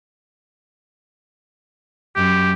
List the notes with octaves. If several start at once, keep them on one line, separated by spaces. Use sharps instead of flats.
F#2 G4